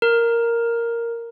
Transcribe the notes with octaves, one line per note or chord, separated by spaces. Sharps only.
A#4